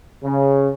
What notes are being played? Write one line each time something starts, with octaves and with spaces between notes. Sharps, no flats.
C#3